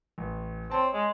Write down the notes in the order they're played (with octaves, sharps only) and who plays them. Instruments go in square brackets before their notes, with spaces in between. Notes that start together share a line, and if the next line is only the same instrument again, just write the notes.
[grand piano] A1
[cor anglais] C4 [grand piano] C#5 A5
[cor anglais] G#3